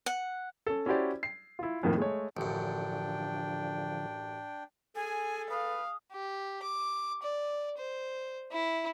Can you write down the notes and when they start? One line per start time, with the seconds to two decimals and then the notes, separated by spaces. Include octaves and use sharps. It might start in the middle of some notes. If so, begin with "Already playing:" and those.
0.06 F#5
0.67 C#4 A4
0.86 C#4 E4 F#4 G4 C5 D5
1.23 C7
1.59 E4 F4
1.83 F2 A2 D#3 F3 A3 A#3
1.98 G#3 A3 C#5
2.37 A1 F#2 D3 F3 D4 G5
4.95 G#4 A4 G#5
5.50 B4 F5 D#6
6.12 G4
6.63 D6
7.23 D5
7.78 C5
8.52 E4